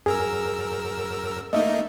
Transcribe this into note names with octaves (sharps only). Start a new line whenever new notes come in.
F#2 G#4 A#4 E6
A3 A#3 D#4 D#5 E5